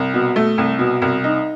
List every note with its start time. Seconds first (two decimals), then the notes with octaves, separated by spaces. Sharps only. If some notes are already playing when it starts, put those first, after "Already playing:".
Already playing: C2
0.14 B2
0.36 A3
0.58 C2
0.79 B2
1.02 C2
1.24 D#4